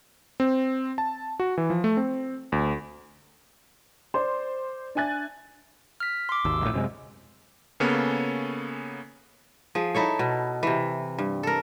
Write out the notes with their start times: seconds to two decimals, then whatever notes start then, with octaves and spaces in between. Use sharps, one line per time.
0.40 C4
0.98 A5
1.40 F#4
1.58 E3
1.70 F3
1.84 A3
1.97 C4
2.52 D2
4.14 C5 D5 C6
4.95 D4 E5 G#5 F#6 A6
6.00 F6 B6
6.29 C6 D6
6.45 G#1 D#2 E6
6.62 A#1 A2
6.74 F#2 C3 G#3
7.80 C#3 A#3 B3 C#4 A4
9.75 F3 G#4
9.95 D#4 E4 A4 C#5
10.19 B2
10.63 C3 E3
11.18 G2
11.43 A4 A#4